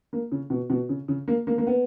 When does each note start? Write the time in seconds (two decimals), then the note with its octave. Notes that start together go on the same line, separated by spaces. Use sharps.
0.13 A#3
0.32 C#3
0.50 B2
0.70 B2
0.89 C#3
1.08 C#3
1.28 A#3
1.47 A#3
1.58 A#3
1.67 B3